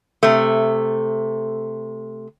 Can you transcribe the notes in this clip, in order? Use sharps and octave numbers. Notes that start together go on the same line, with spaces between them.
C3 A3